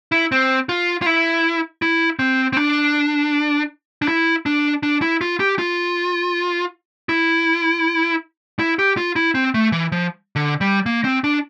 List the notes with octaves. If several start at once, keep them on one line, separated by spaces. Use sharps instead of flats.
E4
C4
F4
F4
E4
E4
C4
C4
D4
D4
E4
D4
D4
E4
F4
G4
F4
E4
E4
G4
F4
E4
C4
A3
E3
F3
D3
G3
A#3
C4
D4